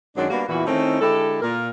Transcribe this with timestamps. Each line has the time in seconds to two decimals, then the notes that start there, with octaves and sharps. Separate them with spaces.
0.16 F#2 D#3 F#3 G#3 D4
0.31 G3 A#3 B3 D4 F#4
0.48 E2 A#2 E3 E4 F#4
0.66 D#3 A3 C4 C#4 D#4 E4
1.01 D3 G#3 E4 G4 A4
1.42 A#2 A#4